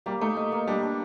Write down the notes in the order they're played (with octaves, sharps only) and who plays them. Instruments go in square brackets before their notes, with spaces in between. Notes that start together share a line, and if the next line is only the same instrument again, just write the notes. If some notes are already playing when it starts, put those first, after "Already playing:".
[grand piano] G3 [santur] A#3
[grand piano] A3 [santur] D#4
[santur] D#5
A#3
[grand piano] G3 [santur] D4
[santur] D4